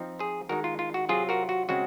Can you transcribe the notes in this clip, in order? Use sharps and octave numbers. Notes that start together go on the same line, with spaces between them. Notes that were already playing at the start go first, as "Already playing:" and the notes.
Already playing: F3 C4 D#4
G#4 C5
D#3 G#3 D#4 F#4 A#4
F4
F4
F#4
C3 F#3 C4 F4 G#4
F#4 A#4
F#4
C#3 G#3 C4 F#4